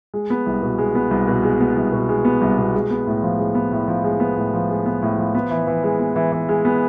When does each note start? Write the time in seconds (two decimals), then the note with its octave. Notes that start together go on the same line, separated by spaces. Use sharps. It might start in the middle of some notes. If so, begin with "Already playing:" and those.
0.14 G#3
0.30 B3
0.46 C2
0.62 B2
0.78 G#3
0.95 B3
1.11 C2
1.27 B2
1.43 G#3
1.60 B3
1.76 C2
1.92 B2
2.09 G#3
2.25 B3
2.41 C2
2.58 B2
2.74 G#3
2.90 B3
3.07 A2
3.23 F3
3.39 G#3
3.55 B3
3.72 A2
3.88 F3
4.04 G#3
4.20 B3
4.37 A2
4.54 F3
4.70 G#3
4.86 B3
5.02 A2
5.18 F3
5.35 B3
5.51 E3
5.67 E3
5.83 G#3
6.00 B3
6.16 E3
6.32 E3
6.49 G#3
6.65 B3